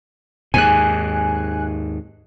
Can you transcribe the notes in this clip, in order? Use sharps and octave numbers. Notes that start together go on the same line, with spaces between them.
D#2 G#2 G#5 F#6